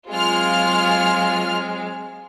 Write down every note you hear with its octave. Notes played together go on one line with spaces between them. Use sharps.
F#3 G#3 C4 F4 F6